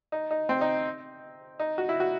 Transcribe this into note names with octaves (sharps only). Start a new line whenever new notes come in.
D#4
D#4
C4
D#4
D#4
F#4
E4
F#4